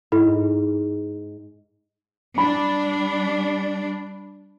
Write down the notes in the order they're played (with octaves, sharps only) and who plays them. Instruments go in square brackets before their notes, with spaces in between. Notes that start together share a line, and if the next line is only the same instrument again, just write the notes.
[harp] G#2 [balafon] E4 A4
[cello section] G3 D4 [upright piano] B5